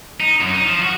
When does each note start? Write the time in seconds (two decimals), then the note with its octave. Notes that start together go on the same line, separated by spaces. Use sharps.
0.20 D#4
0.40 F#2
0.54 D#4
0.67 F3
0.83 F#4